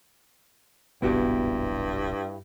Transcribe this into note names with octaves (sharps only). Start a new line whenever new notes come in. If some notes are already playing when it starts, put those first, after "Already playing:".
D1 G#1 G2 C3 B3 E4 F#4 G4